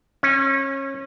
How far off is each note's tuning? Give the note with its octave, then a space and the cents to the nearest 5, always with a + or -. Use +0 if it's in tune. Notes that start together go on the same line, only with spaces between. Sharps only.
C#4 -25